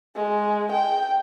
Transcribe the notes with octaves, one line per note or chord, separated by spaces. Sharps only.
G#3
G5